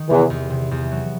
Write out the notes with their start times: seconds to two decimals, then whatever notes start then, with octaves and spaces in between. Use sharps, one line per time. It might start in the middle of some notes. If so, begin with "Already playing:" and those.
Already playing: D#3
0.09 E2 C3 E3
0.30 E2
0.50 C3
0.71 E2
0.92 F#3